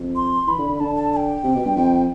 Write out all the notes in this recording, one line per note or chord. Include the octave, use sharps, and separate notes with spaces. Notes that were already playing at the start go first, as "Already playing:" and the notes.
Already playing: F2
C6
E3 B5
D3
D3
D3 A5
A5
A5
G5
C3
B2
G2
F2